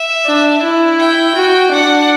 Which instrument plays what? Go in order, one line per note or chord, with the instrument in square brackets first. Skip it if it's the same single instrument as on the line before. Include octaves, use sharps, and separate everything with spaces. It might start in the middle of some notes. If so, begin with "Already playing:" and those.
Already playing: [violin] E5
[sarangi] D4
E4
[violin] G5
[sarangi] F#4
[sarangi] D4 [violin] F#5